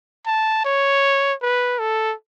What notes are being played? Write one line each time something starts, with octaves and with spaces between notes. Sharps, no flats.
A5
C#5
B4
A4